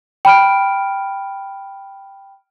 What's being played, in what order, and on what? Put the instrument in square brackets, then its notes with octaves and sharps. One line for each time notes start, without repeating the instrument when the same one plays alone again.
[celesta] G5 B5 F6 D7